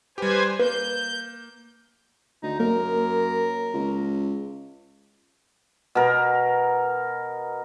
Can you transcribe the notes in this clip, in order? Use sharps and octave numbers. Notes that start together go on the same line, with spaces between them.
G3 G4 B4 C5 G#5
A#3 B4 G6
D2 D#4
F#2 A#3 A#4
C#2
B2 A#4